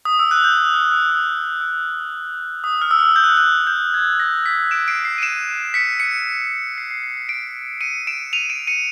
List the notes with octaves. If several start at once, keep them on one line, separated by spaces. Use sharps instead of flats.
D#6
E6
F#6
G6
F6
E6
D#6
E6
D#6
F6
E6
F6
G6
F#6
F6
F#6
G6
G#6
A#6
B6
D7 E7
C7 D7
C7
D#7
D7 E7
B6 C#7
B6 C#7
C7
C7
C7
C7
C7 D7
C#7 D#7
D7 E7
D#7 F7
D7 E7
C#7 D#7